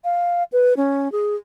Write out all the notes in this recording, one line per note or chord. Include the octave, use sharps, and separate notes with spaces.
F5
B4
C#4
G#4